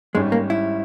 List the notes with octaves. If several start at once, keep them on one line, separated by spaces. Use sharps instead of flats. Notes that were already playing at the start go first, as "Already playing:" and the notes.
G#1 G#2 G3 G#3 C#4
A#3
E4